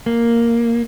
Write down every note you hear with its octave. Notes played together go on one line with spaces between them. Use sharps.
A#3